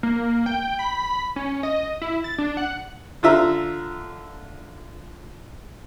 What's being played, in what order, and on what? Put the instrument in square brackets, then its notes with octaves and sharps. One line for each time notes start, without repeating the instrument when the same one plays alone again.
[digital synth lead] A#3
G5
B5
C#4
D#5
E4
A6
D4
F#5
[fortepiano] D3 F4 E5 A#5